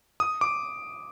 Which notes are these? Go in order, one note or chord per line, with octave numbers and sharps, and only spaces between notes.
D#6
D6